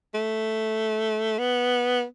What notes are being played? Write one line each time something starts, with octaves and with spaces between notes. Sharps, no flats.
A3
B3